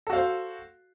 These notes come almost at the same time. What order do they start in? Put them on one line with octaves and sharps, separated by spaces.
A4 F#4 F5 C5